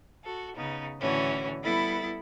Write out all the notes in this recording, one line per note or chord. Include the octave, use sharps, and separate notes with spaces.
F#4 A4
C#3 B3 D#4
A2 D3 E3 C#4 F#4
G3 B3 E4 A4 B5 A6